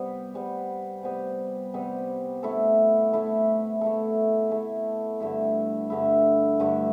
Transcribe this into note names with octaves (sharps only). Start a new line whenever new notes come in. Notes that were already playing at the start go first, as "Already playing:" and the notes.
Already playing: C3 G3 B3
C3 G3 B3
C3 G3 B3
C3 G3 B3
A3 E4 A4
A3 E4 A4
A3 E4 A4
A3 E4 A4
G2 D3 A3 E4
G2 D3 A3 E4
G2 D3 A3 E4